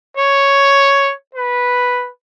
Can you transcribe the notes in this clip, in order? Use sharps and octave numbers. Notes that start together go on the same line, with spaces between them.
C#5
B4